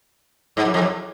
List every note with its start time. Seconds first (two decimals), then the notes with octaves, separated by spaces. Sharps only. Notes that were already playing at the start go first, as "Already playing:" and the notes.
0.57 G#2
0.65 F#2
0.74 F2
0.81 F#2